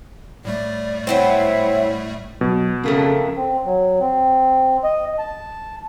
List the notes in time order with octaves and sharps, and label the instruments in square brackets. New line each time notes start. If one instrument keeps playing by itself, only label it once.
[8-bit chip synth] A2 G3 A3 [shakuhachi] D5
[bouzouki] F#3 B3 C4 [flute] E4 [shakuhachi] E5
[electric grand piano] B2 [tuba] F#3
[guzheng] F2 A3 A#3 [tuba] C#3
[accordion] C4
F#3
C4
D#5
A5